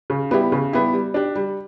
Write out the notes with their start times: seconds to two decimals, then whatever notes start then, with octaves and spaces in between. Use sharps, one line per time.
0.10 C#3
0.31 G3 B3 E4 G4
0.52 C#3
0.73 G3 B3 E4 G4
0.93 G3
1.14 D4 G4
1.35 G3